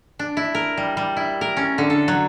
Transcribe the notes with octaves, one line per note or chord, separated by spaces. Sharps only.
D4
E4
A#4
G3
G3
E4
A#4
C#4
D3
A4
F#3